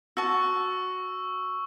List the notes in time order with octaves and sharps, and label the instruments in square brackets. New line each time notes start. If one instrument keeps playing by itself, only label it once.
[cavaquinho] F#4 A5 [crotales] C#6 E6